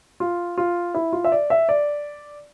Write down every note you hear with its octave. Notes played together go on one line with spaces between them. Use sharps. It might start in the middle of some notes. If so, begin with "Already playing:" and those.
F4
F4
E4
F4
E5
D5
E5
D5